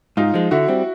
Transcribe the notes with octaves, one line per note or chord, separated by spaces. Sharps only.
G#2 D#4 F4
F3 G#3
D3 E4 F#4
G3 C4